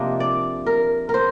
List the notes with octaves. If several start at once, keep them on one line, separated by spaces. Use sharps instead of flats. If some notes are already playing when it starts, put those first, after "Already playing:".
Already playing: C3 F3 A#3 D4 D#5
D5
A#4
A#4
C5